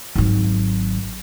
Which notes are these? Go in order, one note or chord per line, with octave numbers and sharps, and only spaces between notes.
G#1 F#3